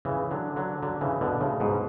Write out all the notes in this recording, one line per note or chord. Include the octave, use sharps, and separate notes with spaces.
C#3 E3
D3 F#3
D3 F#3
D3 F#3
C#3 E3
B2 D3
A2 C#3
G#2 B2